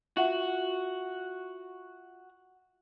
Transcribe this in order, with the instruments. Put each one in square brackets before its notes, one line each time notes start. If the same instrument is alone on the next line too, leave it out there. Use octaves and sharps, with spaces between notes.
[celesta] F4 E5 F#5 [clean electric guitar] F#4